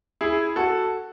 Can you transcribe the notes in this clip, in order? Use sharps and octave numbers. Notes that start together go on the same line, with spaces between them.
E4 G#4
F#4 A4